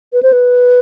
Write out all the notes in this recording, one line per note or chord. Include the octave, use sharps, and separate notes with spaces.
B4
C5
B4